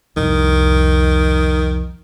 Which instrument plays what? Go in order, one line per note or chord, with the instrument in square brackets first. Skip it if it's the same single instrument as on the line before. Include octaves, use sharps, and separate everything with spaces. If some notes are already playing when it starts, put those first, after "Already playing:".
[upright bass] C2 F2 [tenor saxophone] D#3